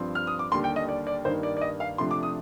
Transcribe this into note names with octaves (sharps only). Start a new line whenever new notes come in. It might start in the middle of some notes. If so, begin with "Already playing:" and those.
Already playing: G2 F3 C4
F6
D#6
D6
D#2 D3 G3 C6
G5
D#5
D5
D5
G2 D#3 A#3 D#4 C5
D5
D5
D#5
F5
C3 F3 A3 D4 C6
D6
D#6